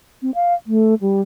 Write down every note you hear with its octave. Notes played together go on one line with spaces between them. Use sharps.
C4
F5
A3
G3